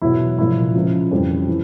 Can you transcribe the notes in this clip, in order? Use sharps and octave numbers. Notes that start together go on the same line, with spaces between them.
E2 B2 F#3 E4
C2 A#2 F3 E4
C#2 C#3 F3
F2 C#3 E3 G3
E3